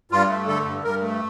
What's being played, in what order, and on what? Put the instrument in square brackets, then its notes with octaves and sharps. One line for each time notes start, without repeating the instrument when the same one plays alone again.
[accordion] G2 F4
A3
D3 A4
G2
G2 A#4
A3